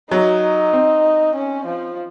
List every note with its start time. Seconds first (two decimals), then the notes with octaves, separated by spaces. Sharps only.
0.11 F#3 D#4
0.73 C4
1.35 C#4
1.66 F3